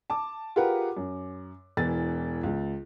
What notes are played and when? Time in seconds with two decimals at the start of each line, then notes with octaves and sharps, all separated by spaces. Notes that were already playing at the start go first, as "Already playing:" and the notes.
0.10 A5 D6
0.56 F4 G4 G#4 A#4 B4 F#5
0.97 F#2
1.77 E1 E3 A6
2.43 C#2